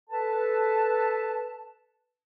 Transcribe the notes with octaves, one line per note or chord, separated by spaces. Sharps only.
A4 B4 A5